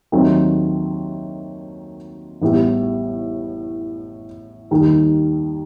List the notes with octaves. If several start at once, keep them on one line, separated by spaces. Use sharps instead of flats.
D#2 D#3 F#3 A3 C4
A1 A2 G3 B3
D#2 D#3 G3 D#4